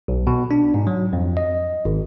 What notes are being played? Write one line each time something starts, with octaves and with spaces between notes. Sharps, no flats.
B1
B2
D4
G#2
F#3
F2
D#5
G#1